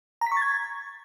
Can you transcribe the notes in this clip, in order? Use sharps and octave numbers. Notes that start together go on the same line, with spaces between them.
A#5
B6
C#6
A6
G#6